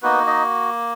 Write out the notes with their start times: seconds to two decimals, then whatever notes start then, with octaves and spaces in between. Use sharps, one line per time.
0.03 A#3 B3 D#4 F#4 B4
0.27 D#4 D#5